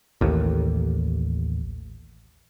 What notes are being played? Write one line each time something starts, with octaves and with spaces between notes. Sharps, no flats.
A1 D#2